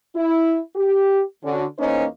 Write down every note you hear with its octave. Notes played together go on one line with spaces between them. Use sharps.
E4
G4
D3 C#4 F#4
E2 A#3 C#4 D#4 C5 D#5